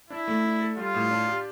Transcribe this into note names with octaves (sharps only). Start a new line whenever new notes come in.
D4 E4
A3
D4
A4
G3 F4
A2
D4
G4